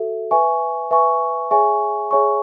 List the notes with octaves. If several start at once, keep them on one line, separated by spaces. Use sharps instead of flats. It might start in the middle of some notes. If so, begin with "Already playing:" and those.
Already playing: F#4 A4 E5
B4 E5 G#5 C#6
B4 E5 G#5 C#6
G#4 C#5 E5 G#5 C#6
G#4 C#5 E5 G#5 C#6